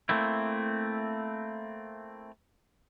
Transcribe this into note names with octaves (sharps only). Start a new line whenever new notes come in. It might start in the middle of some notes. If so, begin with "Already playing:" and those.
A3 A#3 C4 E4